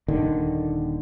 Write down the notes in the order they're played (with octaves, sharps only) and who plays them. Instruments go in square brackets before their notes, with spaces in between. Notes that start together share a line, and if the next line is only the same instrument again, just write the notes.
[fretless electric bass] D#1 D#2 D3 D#3